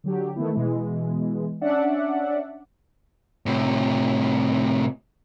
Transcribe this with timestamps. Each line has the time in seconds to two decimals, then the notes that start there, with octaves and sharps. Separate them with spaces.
0.04 D3 F#3 G4
0.36 D#3 E3 A3 B3 E4
0.53 B2 E3 G#3
1.61 C#4 D4 D5 E5 F#5
3.46 A2 C3